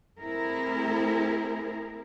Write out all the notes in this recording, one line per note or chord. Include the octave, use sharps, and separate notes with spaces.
A3 C4 E4 G#4 A#4